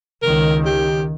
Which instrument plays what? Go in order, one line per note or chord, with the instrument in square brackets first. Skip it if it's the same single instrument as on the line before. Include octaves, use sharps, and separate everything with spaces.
[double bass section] C#2 D#3 [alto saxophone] A#4
[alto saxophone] G4